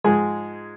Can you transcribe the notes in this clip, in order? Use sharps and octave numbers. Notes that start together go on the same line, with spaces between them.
G#2 F3 G#3 G#4